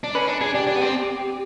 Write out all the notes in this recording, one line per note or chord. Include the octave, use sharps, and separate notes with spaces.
D4
C#4 B4
D4
D4 G#4
D4 G4
D4
B3
C4